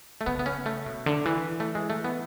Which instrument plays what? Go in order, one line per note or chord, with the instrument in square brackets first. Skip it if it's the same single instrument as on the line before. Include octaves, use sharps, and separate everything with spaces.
[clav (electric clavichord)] A3
[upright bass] C#3 [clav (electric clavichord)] B3
[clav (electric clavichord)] B3
C#4
A3
[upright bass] B2
D3
E3
[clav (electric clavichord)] A3
G#3
A3
B3